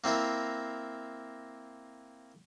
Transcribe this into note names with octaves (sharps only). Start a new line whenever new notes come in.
A#3 C4 E4 A#4